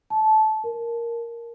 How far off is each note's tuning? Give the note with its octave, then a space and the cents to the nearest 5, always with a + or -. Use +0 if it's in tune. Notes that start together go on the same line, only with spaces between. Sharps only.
A5 -15
A#4 +0